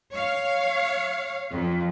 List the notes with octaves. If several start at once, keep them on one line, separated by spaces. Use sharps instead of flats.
C#5 F5
F2